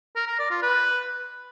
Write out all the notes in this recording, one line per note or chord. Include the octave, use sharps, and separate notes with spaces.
A#4
A#4
D5
F4
B4